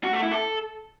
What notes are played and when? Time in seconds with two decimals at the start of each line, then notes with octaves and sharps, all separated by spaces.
0.04 F#4
0.13 A3
0.22 E4
0.31 A4